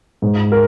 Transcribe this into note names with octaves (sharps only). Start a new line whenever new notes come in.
G#2
A#4